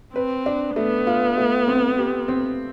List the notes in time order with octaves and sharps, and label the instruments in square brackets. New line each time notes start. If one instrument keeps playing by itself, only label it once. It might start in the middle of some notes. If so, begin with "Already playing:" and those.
[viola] C4 [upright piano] B4
[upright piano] D4
[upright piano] A3 [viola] B3
[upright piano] F4
A3
C4
G4
C4